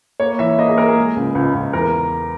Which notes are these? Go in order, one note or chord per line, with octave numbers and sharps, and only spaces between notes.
A#3 C#5
E3 E5
A#3 D#5
G#4
A#3 A#4
G#4
G#3
C#2
C#2
C#2
E2 A#4